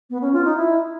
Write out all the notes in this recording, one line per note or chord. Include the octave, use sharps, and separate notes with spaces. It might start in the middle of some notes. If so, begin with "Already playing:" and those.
B3
C#4
F4
D#4
E4